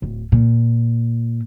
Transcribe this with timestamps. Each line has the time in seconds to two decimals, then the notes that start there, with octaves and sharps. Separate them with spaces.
0.02 D1
0.32 A#2